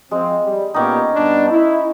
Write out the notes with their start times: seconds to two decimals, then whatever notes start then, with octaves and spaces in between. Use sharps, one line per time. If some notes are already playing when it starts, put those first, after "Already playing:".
0.11 F3 G#3 C4
0.44 G3
0.74 A#2 B3 C#4 D#4 G4
1.15 G2 B3 D4
1.51 E4